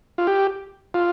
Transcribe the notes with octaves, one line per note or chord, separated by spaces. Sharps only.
F4
G4
F4